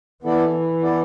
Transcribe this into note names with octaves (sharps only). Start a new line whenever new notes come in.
E3 B3 E4 A4 D5
B3 E4 A4 D5